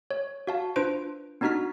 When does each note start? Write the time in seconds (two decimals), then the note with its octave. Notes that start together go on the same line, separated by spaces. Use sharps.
0.11 C#5
0.47 F#4 F5 A5
0.76 D4 F4 B4 C5 D7
1.41 B3 D4 D#4 F#4 F6 B6